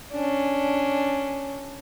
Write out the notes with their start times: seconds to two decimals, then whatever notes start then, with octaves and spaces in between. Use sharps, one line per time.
0.12 C#4 D4